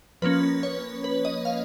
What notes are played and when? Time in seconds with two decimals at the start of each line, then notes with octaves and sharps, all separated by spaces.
0.22 F3 A#3 C#4 B4
0.63 C#5
1.04 B4
1.25 D#5
1.45 F5